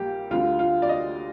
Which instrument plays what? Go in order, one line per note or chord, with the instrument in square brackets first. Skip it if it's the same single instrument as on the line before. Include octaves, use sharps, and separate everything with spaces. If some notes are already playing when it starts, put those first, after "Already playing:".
Already playing: [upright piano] A#1 A#2 G3 A#3 G4
D2 D3 G3 F4
F4
D5
D#5